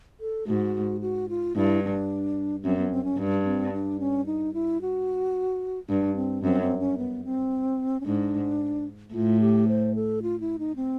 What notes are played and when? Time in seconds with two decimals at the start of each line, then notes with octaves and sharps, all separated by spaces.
0.20 A4
0.47 G#2 F#4
1.01 F#4
1.29 F4
1.56 G2 E4
1.83 D4
2.64 F#2 C4
2.78 B3
2.91 C4
3.04 C#4
3.18 G2
3.45 C4
3.73 D4
4.00 C#4
4.26 D#4
4.54 E4
4.81 F#4
5.89 G2 D4
6.16 C4
6.43 F#2 C4
6.61 C4
6.79 C#4
6.98 B3
7.24 C4
8.01 C#4
8.06 G#2 D4
9.13 A2 F4
9.41 G4
9.68 C5
9.95 A4
10.22 F4
10.40 E4
10.59 D#4
10.76 C4